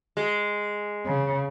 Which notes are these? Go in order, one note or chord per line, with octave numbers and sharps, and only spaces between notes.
G#3
C#3